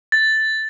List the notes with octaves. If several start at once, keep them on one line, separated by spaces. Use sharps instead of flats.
A6